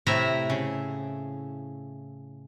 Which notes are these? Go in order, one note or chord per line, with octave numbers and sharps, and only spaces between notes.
A2 C3 A3 E4 E5 A#5
C#3